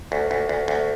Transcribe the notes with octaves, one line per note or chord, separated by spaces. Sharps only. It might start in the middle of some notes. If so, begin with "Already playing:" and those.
D2
D2
D2
D2